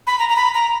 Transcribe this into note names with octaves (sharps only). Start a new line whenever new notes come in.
B5
A#5
A#5
B5
A#5